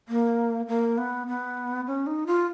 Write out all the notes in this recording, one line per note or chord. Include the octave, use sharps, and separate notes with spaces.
A#3
A#3
B3
B3
C#4
D#4
F4